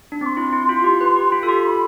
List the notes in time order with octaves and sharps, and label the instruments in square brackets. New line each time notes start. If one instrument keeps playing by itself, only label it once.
[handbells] D4
[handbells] C4 [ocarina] D6
[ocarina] C6
[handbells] E4
E4
F4
G4
B4
G4
F4
A4
G4
[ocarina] B5